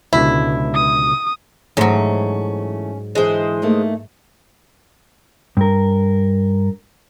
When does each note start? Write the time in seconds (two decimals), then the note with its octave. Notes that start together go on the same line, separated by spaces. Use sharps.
0.13 C#2 B2 D3 E4
0.75 D#6
1.77 G#2 E3 F#3 A3 C#4 C5
3.15 D3 E3 G#3 C5
3.62 A3 A#3 D#4
5.57 G2 A#4